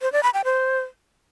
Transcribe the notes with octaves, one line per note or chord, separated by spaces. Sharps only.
C5
D5
B5
G5
C5